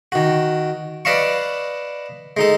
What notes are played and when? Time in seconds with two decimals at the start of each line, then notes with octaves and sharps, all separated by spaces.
0.12 D#3 F#4
1.05 B4 D5 D#5 F5 A5 C#6
2.37 G#3 D#4 A4